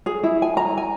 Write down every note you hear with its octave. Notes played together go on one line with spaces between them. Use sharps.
G#4
E4
G#5
A#5
G#5